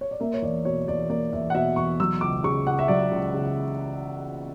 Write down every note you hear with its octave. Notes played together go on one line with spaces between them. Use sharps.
C#5
D5
A#3 E5
C#5
E2 D5
B2 C#5
E2 D5
A#3 D5
E2 E5
F#5
B2 E5
E2 C#6
F#3 E6
C#2 D6
C#3 C#6
C#2 F#5
E5
F#3 D5
C#2
C#3